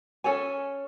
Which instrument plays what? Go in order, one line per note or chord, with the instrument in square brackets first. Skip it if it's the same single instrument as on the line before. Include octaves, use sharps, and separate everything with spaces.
[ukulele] C#4 A4 C#5 G#5